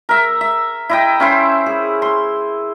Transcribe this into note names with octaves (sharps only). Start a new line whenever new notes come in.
A#4 E5
E5
E4 D#5 G5
C#4 E4 C5
G#4
C6